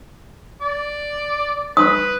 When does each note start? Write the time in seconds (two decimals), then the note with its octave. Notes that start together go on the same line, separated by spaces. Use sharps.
0.61 D5
1.77 B4 D#6